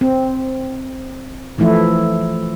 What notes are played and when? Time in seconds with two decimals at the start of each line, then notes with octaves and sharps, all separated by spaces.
0.01 C4
1.58 E3 F3 A3 E4